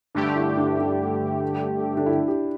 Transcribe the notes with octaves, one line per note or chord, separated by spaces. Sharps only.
G2 D3 A3 D4 G4
E4
D4
D4
D4
E4
G4